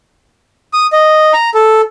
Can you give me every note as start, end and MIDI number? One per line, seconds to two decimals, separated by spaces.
0.73 0.87 87
0.93 1.33 75
1.33 1.50 82
1.55 1.81 69